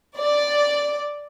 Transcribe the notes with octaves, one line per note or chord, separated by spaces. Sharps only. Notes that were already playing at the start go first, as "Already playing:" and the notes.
D5